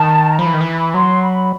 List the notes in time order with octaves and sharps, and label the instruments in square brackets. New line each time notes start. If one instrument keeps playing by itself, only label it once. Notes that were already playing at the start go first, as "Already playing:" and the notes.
Already playing: [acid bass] D#3 [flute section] A5
[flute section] A#5
[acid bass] F3 [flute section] B5
[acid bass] E3
D#3
E3
[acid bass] F#3 [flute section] C6
[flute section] B5